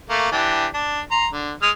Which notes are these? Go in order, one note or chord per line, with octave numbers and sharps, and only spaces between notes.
A3 A#3
E3 D4 G4
D4
A#5 C6
D3
G#3 D#6 F6